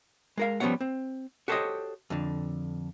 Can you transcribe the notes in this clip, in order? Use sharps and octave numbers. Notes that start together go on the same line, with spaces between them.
G#3 A#4 F5
F3 G3 B3 C#4 C#5 F#5
C4
F#4 G4 A4 C5 C#5 D#5
F2 D3